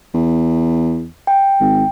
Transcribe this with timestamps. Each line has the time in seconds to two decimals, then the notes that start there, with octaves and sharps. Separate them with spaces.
0.14 E2
1.27 G5
1.60 G#1